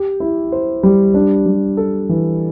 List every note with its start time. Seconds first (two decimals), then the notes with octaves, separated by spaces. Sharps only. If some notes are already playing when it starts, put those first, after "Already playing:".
Already playing: G4
0.20 E4
0.52 C5
0.83 G3
1.14 D4
1.46 G3
1.77 A4
2.09 E3